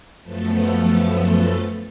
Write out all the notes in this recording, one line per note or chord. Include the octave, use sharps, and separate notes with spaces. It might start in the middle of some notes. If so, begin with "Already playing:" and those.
F#2 F3 A3 B3 A4